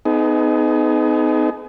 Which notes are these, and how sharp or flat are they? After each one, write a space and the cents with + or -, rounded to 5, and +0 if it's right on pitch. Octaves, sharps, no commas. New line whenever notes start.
B3 +40 D#4 +0 G#4 +40